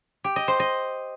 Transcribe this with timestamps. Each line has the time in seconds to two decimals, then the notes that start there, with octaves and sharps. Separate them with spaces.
0.24 G4
0.36 D#5
0.48 C5
0.60 D#5